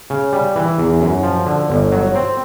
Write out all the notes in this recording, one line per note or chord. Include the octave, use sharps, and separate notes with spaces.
C#3
G3
E3
E2
F#2
F3
D3
G1
F#3
C4